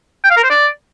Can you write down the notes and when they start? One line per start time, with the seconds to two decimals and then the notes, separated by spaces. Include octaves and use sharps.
0.24 G5
0.31 F5
0.37 A#4
0.44 C5
0.50 D5